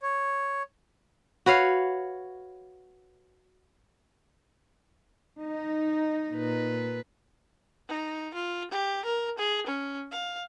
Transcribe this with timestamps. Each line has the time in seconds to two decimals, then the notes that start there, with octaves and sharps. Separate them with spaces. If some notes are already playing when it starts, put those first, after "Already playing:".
0.02 C#5
1.46 F#4 B4 C#5 F5
5.42 D#4
6.31 A#2 B4
7.88 D#4
8.34 F4
8.71 G4
9.05 A#4
9.38 G#4
9.67 C#4
10.12 F5